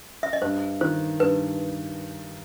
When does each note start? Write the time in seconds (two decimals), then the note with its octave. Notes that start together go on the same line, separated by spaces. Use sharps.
0.23 E5
0.33 D#5
0.42 G2 C5
0.81 D#3 C5
1.20 G2 B4